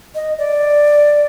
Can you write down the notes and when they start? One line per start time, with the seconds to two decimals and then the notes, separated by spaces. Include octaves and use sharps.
0.15 D#5
0.39 D5